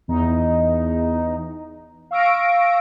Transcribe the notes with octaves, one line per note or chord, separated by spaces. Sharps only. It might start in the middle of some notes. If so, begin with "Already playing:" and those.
E2 D#4
F5 C#6 E6 A#6 D7